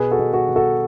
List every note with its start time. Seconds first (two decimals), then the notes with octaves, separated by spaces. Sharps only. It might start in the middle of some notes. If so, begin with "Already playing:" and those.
Already playing: B2 G#4 B4
0.11 F#4 A4
0.19 B2
0.33 F#4 A4
0.49 B2
0.56 F#4 A4